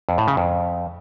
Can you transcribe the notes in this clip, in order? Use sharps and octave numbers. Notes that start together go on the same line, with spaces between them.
F2
A2
C#3
F2